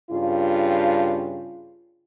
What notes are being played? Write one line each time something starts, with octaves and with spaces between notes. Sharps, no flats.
G2 C#3 F4